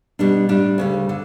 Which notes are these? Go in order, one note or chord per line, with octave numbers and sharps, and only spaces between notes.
B2 G3 D4
A2 G3 D4
D2 C#3 G3
D3